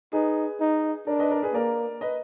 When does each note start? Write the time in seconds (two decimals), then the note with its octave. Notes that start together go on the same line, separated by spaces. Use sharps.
0.13 D#4 G#4 B4
0.61 D#4
1.07 D4 A#4 D5
1.19 B4 D#5
1.31 A#4 D5
1.42 G#4 B4
1.54 A#3 A#4 D5
2.01 B4 D#5